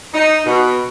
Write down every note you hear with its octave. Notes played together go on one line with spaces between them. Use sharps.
D#4
B2